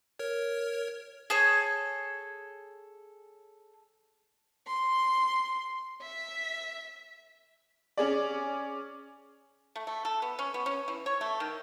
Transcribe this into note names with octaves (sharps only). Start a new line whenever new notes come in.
A#4 C#5
G#4 A4 C#5
C6
E5
C#4 G#4 D5
A3
A3
A4
B3
C#4
B3
C#4
E3
C#5
A3
D#3